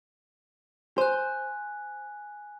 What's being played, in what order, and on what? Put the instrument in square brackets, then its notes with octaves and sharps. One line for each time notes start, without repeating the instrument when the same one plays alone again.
[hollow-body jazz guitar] C5 [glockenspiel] G#5 F#6